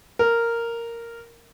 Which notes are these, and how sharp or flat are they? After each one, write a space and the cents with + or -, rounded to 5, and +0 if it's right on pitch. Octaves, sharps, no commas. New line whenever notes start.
A#4 -5